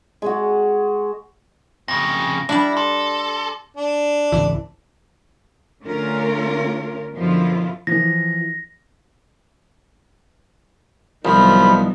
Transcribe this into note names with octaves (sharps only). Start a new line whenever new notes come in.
G#3 F#4
F2 C#3 A#6
G3 D4 E4 D6 F#7
A4 C6
D4
G#1 C#2 E3
D3 A3 C#4 F4 A#4 C#5
F#2 B2 D3 F3 E4 F4
E3 F3 A#6
C2 D#3 F3 F#3 B3 B5